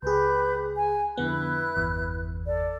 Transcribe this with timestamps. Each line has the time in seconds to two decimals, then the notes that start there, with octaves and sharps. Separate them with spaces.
0.02 C#2 G4 G#4 B4 G6
0.75 G#5
1.17 F2 D3 B3 E4 B4 F#6
1.76 G1 E2
2.46 A4 D5